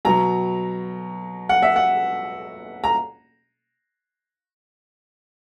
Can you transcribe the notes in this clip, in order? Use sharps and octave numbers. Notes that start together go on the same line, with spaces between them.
B2 F#3 A#5
F#5
E5
F#5
A#5